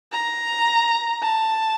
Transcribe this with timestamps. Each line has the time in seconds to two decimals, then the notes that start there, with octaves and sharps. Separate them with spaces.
0.12 A#5
1.22 A5